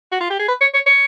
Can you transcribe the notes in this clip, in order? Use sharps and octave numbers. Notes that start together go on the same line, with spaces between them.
F#4
F4
G4
G#4
B4
C#5
C#5
C#5